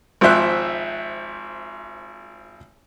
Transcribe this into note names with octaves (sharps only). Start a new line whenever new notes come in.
G#1 F3 C5 E5 F#6